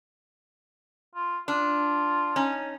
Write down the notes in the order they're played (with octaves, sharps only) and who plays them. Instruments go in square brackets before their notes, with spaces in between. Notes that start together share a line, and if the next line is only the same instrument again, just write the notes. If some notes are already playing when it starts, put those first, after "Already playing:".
[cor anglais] F4
[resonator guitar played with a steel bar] D4 [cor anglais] F4
[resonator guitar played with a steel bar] C#4 D#4